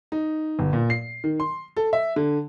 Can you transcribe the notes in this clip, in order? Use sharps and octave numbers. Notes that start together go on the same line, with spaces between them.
D#4
G1
A#2
C7
D#3
C6
A4
E5
D3